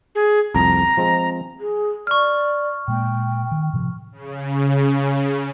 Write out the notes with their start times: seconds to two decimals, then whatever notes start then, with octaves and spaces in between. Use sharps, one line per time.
0.15 G#4
0.54 C2 F2 A5 A#5
0.97 F3 G#3 C4
1.60 G#4
2.07 D5 C#6 F6
2.88 A#2 G#3 A#3 G5
3.51 D#3
3.73 A2 C3 F3
4.12 C#3